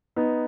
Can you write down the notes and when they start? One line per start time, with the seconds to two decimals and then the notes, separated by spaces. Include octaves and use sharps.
0.16 B3 D#4